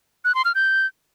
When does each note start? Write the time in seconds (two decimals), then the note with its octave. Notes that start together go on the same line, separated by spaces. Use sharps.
0.25 F#6
0.35 C6
0.45 F6
0.55 G6